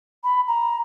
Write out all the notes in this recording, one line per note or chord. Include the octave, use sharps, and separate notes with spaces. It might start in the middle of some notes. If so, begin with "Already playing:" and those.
B5
A#5